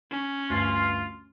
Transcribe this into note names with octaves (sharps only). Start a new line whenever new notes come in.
C#4
D2 G2 F4